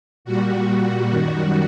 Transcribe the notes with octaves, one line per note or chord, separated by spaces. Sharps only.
A#2 G3 F#4
F#4
F#2 D#3 G3